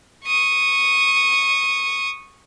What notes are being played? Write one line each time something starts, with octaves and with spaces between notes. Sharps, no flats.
C#6 D#6